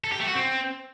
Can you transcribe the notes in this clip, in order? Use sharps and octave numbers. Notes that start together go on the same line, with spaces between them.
A4
G4
A3
F#4
C4